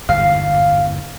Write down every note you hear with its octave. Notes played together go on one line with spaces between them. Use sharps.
G1 E2 G#2 F5